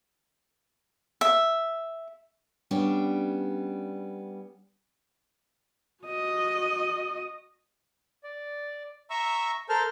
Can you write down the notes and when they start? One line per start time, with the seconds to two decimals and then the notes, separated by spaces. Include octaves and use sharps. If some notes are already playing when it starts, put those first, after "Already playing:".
1.21 E5
2.71 G3 B3 C#4 D4 G5
6.04 F#4 D#5
8.24 D5
9.10 E5 A#5 C#6 E6
9.69 A4 A#4 C5 A5 F6